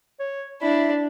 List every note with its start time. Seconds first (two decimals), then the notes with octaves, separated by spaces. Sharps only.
0.20 C#5
0.62 D4 E4 B5